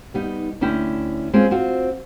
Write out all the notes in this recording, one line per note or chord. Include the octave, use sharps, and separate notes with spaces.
G3 B3 D#4
D2 C#4 D4 E4 G5
G#3 C4 C#4 F4
C4 F4 F#4